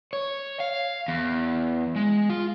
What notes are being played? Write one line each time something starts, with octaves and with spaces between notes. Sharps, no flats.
C#5
F5
E2
G#3
F4